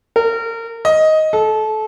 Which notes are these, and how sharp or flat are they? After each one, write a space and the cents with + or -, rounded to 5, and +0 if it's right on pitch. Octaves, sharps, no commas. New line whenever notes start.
A#4 -30
D#5 +10
A4 -25